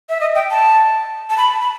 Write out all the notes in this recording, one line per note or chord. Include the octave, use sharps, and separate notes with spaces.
E5
D#5
G5
A5
A5
B5
B5